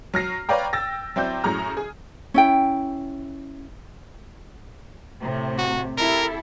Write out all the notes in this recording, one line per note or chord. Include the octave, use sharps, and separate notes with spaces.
F#3 F6 A#6 C7
B4 C#5 D5 F5 G5 A#5
G5 E6 A6 A#6
F#3 C4 E4 D5 G6
F#2 A2 F#3 G#4 A#5 F6
G#4
C#4 E4 G5
A2 C3
F#4
E4 G4 A4 A#4